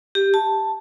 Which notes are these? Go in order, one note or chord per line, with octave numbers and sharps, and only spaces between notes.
G4
A5